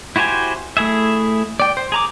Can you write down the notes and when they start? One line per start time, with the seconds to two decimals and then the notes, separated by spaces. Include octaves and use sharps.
0.16 E4 F#4 G4 C5 G#5
0.77 A3 E4 G#4 E5
1.60 D5 G5
1.77 C5
1.92 G#4 A#5 D6